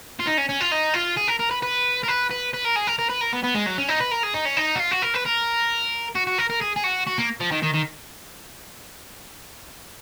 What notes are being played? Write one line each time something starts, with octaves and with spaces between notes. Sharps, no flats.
F4
D#4
C#4
C#4
F4
D#4
F4
G#4
A#4
A#4
B4
B4
A#4
B4
B4
B4
A#4
G#4
A#4
A#4
B4
A#4
B3
B3
G#3
F#3
C#4
D#4
B4
A#4
G#4
D#4
C#4
D#4
F#4
F4
F#4
A#4
B4
A#4
F#4
F#4
A#4
A#4
G#4
G#4
F#4
F#4
A#3
F3
D#3
D#3
D#3